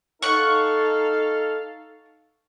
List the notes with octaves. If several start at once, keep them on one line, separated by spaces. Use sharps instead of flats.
D#4 A4 F5 F#5 C#6